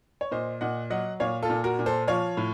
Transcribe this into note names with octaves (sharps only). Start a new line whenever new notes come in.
C#5
A#2 C5 D#5
A#2 D#5 F#5
F#3 D#5 F#5
A#2 C#5 F5
F4 A4
A#2
F#4 A#4
A#2
A4 C5
F3 C#5 F5
A2